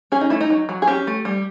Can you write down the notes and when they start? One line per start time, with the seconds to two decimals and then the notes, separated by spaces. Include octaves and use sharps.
0.12 C#4 G#4
0.21 D#4
0.30 A3 E4
0.41 D#4
0.50 F#3
0.69 F#3
0.82 G#4
0.87 C#4 G4
1.07 A3
1.25 G3